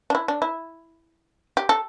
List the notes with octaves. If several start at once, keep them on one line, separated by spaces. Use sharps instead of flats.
D4
E4
D4
E4
G4
A4